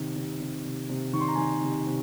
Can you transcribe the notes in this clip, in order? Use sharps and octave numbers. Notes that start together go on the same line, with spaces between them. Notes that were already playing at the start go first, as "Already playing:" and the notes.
Already playing: C3 D#3
C3
C3
C3
C3
D#3 C#6
C6
A#5
D#3 G#5 C6
C3
C3